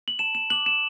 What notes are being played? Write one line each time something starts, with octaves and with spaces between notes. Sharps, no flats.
F#7
A5 E7
E7
D6 F#6 F#7
E7